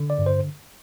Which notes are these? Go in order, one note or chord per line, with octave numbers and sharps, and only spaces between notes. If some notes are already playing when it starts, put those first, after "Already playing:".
Already playing: D3
D5
G2
C5